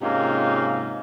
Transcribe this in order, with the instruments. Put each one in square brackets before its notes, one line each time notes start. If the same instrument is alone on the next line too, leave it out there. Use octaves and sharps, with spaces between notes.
[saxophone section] G#2 C3 A#3 C#4 D#4 F4